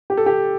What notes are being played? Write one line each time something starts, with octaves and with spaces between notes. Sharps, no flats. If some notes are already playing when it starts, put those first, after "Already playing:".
G4
A4
G4